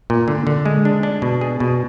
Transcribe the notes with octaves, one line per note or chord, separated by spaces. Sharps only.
A#2
D3
D3
G#3
D4
D4
B2
G#4
B2